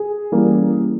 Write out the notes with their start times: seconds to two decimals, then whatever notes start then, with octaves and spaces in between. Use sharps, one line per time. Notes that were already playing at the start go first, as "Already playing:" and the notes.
Already playing: G#4
0.32 E3 G3 A#3 C#4